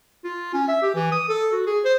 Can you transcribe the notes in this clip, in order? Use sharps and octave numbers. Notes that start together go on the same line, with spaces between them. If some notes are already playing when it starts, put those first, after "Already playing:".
F4
C#4
E5
G4
E3
D#6
A4
F#4
G#4
C5